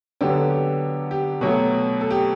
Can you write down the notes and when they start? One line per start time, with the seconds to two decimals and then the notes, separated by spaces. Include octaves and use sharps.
0.21 D3 F#3 B3 D4 G4
0.36 A4
0.50 G4
1.11 G4
1.41 B2 F#3 A3
2.01 A4
2.11 G4